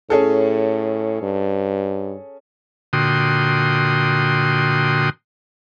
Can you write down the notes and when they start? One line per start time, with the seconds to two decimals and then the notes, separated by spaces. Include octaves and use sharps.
0.10 A2 C#4 G#4 A4
1.22 G2
2.93 A#2 D3 F#4 G5 C6 D#6